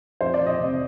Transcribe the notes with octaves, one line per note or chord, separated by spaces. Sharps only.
F2 C5
D5
F2
D#5
C3